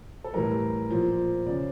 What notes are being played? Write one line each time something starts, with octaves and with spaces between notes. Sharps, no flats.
A4
A2 E3 G3 A#4
A#2 F3
C#3 F3 D5